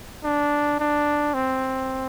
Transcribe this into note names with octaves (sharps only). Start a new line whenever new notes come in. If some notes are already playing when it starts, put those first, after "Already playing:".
D4
D4
C4